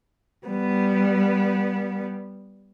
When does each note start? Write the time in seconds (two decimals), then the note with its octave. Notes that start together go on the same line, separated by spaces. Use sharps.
0.46 G3 B3